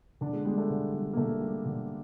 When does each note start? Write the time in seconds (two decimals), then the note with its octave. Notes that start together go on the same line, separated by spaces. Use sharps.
0.21 D3 D4
0.33 G#3
0.45 G3 G#3
0.58 A3
0.70 D3
0.93 G3
1.13 A#3
1.17 D3 A3
1.41 G3
1.65 D3